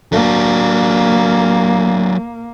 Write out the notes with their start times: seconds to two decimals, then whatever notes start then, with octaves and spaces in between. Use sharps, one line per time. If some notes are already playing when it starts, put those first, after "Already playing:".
0.12 F#3 A#3 D4